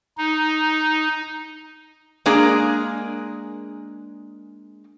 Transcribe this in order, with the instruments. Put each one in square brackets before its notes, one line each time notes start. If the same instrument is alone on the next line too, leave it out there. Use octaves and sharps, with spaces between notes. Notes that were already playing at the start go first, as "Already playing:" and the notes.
[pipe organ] D#4
[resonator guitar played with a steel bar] G#3 A#3 D4 G#4 A#4